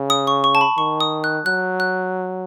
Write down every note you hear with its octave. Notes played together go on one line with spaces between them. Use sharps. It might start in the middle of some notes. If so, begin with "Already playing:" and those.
Already playing: C#3
D#6
C#6
C#6
A5
B5
D#3 C#6
D#6
F#6
F#3 F#6
F#6